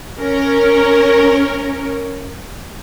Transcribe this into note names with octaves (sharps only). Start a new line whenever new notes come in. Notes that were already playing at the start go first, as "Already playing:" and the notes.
C#4 A#4 C#5